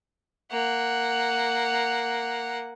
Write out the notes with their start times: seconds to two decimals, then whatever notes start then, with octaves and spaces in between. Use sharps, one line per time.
0.52 A#3 F#5